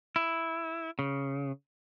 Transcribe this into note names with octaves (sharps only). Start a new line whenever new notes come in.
E4
C#3